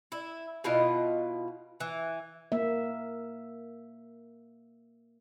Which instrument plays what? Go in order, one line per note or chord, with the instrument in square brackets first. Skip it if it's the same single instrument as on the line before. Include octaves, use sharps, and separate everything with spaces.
[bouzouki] E4
B2 E4 F4 D#5
E3
[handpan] A#3 E5